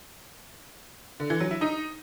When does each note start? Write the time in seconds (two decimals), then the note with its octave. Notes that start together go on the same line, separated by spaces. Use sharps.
1.20 D3
1.30 E3
1.40 F#3
1.51 E4
1.61 D#4